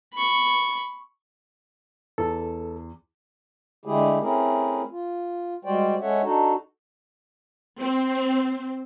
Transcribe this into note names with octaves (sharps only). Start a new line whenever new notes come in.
B5 C#6
E2 A4
D3 G#3 A3 E4 G4 G#4
A3 C4 C#4 E4 G#4 A#4
F4
G3 G#3 F#4 C5 D5 G5
G#3 C#4 A4 C#5 E5 F#5
D4 D#4 F#4 A4
C4